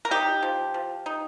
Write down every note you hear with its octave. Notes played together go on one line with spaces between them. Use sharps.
A#4
D#4 G4
F3
F3
D#4